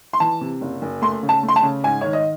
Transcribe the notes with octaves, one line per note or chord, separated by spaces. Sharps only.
C6
E3 A5
C3
F#1
F#1
A3 C6
C#3
A5
A3
C6
A5
C#3
G#2 G#5
D#3 C#5
D#5